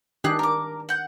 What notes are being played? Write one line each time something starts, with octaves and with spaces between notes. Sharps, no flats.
D#3 D4 G4 G#4 F#6
A#4 D6
F#5 G6